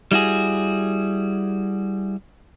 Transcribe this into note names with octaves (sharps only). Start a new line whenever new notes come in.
G3 E4 F#4 G#4